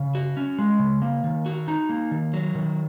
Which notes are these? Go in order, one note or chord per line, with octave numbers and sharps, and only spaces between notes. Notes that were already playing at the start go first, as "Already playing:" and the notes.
Already playing: C#3
F#4
C#4
G#3
C#3
A#3
D#3
F#4
D#4
A#3
D#3
F#3
D#3